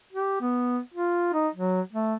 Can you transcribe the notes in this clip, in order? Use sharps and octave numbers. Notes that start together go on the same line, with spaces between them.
G4
B3
F4
D#4
F#3
A3